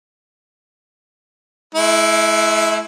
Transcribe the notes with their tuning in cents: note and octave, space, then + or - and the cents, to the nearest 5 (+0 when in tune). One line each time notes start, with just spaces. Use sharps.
G#3 +45 E4 +0